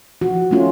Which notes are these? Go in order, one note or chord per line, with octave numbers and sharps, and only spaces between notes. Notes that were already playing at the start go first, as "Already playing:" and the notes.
F3 F#4
A3 C#4 F4